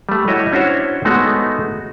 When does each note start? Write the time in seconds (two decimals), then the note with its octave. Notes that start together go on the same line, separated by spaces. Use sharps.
0.09 G3 A3
0.28 E4 F#4 C#5 D#5
0.52 C#4 D4 E4 F#4 C5 C#5
1.05 G#3 A3 B3 D#4 F#4